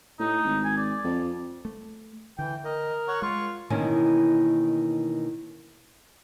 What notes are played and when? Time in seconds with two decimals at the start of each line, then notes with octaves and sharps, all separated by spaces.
0.19 A2 D#4
0.44 G#1
0.64 G#5
0.77 D5
1.04 F2
1.65 A3
2.39 D3 E3 G5
2.65 A#4 D#5
3.08 C#5 F#5 C#6
3.22 G#3 F4 C#6
3.70 B2 D#3 E3 A#3 C#4